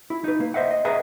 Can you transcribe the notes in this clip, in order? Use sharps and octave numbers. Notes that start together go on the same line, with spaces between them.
E4
D#4 B4
A#3
C5 D#5 E5 F#5
D#5
G#4 B4 D#5 E5 F#5 A#5